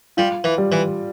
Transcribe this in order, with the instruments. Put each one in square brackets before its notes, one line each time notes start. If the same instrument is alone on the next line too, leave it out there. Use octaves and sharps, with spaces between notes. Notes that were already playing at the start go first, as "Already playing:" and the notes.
[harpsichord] G3 [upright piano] F4
[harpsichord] E3
[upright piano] G3
[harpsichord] E3